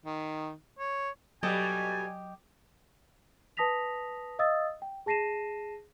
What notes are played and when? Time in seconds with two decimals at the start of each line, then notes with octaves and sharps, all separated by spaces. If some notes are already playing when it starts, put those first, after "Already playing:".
0.06 D#3
0.78 C#5
1.43 B2 F#3 G3 G4 A4 D#5 G#5
3.57 B4 A5 D#6 A#6 B6 F7
4.39 D#5 F5 D#6 E6 A6
4.82 G5
5.06 G#4 A5 A#6 C7 D#7 E7